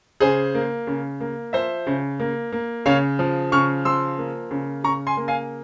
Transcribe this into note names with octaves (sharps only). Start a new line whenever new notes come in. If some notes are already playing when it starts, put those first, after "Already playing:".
C#3 G#4 C5
A#3
C#3
A#3
F3 C5 E5
C#3
A#3
A#3
C#3 C#5 F5
F3
C#3 C#6 F6
F3 C6 E6
A#3
C#3
C#3 A#5 C#6
G#5 C6
A#3
F5 G#5